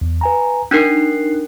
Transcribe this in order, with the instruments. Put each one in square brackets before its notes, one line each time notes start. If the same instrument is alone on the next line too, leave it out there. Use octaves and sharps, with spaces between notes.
[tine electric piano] E2
B4 G#5 A#5
[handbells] D4 D#4 A#4 [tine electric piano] F#6 C7